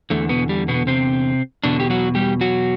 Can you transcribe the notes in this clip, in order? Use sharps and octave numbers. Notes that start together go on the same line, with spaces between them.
E2 D3 A3
B2 B3
G3
B2 B3
C3 C4
E2 B2 D3 D4
G4
F#3 F#4
G3 G4
F#3 F#4